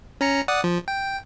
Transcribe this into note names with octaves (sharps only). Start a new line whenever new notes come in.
C#4 A#5 C#7
D5 F#5 D#6
F3
G5